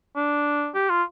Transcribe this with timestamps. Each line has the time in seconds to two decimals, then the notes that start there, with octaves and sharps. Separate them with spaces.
0.16 D4
0.75 G4
0.90 F4